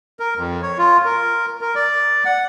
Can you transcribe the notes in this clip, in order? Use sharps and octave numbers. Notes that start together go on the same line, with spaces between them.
A#4
F2
C#5
F4
A#4
A#4
D5
F#5